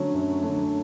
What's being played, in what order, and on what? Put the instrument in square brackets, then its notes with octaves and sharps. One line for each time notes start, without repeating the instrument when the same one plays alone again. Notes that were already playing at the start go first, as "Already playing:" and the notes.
Already playing: [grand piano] D3 F#3 A3 [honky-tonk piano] C#4
[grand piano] F#2
D3 F#3 A3